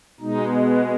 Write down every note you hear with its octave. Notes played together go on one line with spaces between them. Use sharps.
B2 G#3 D#4
B3